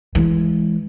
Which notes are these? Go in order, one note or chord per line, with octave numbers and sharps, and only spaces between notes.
E3 G#3